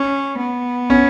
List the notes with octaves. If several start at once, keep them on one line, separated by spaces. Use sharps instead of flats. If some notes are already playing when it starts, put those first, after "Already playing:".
Already playing: C#4
B3
C#4